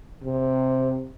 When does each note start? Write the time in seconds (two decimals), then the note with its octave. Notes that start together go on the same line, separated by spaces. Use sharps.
0.24 C3